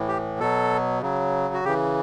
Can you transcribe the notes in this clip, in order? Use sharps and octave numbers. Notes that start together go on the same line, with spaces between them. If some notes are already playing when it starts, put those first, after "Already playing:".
Already playing: A2 E3
G4
B2 F#3 A4
C#3 F#3
F#4
C#3 E3 G4